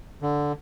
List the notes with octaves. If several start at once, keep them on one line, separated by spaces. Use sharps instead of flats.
D3